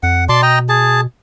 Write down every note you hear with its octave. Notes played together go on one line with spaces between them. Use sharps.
F2 F#5
B2 D5 A5 C6
D#5 G5 A#5
G#4 A5